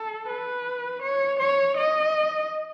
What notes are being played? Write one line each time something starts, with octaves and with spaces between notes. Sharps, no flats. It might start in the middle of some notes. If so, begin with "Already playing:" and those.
Already playing: A4
B4
C#5
C#5
D#5